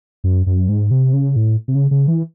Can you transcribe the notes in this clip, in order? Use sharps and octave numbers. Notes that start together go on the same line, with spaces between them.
F#2
F#2
G#2
C3
C#3
A2
C3
C#3
C#3
E3